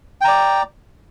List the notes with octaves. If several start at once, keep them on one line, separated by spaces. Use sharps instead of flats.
D5 G5 A#5